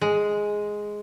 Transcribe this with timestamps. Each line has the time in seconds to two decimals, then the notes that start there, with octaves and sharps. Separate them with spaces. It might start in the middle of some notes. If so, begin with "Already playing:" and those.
0.01 G#3